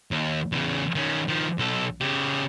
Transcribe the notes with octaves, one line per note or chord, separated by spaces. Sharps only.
D#2
E2 C#3
D#3 C#4
D#3 F3
B1 A4
C#3 G4